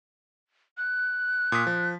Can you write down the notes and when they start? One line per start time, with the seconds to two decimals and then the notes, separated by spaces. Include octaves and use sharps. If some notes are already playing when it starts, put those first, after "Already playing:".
0.78 F#6
1.52 A#2 D#6 B6
1.67 F3